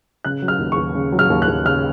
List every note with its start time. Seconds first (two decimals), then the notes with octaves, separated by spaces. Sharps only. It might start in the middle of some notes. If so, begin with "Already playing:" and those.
0.25 C#3 F#6
0.42 F#3
0.48 F6
0.59 D#2
0.72 C#6
0.77 D#2
0.95 C#3
1.12 F#3
1.19 F6
1.30 D#2
1.42 F#6
1.48 D#2
1.65 C#3 F6